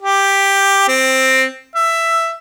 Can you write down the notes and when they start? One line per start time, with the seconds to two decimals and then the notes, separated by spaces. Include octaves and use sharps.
0.02 G4
0.88 C4
1.75 E5